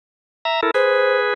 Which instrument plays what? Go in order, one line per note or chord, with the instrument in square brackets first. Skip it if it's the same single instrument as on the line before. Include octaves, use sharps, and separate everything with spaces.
[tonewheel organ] E5 A#5
E4 A4 A#4
[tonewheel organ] G#4 B4 [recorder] C5